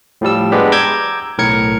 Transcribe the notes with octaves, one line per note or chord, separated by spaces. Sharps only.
A2 F3 G3 E6
G#3 B3 D4 G4
A#5 D6 E6 G6 G#6
B1 A2 A#4 G#6 C#7